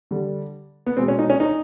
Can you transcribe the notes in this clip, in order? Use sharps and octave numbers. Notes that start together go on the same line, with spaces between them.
D3 G3
B3
B2 G#3 C4
C#4
D#4
C#4
D#4